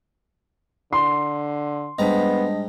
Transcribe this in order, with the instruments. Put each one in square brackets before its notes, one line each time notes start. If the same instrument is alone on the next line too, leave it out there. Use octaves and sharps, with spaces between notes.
[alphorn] D3 [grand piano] C6
[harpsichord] G#2 G3 A#5 [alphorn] B3 [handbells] D4 D#5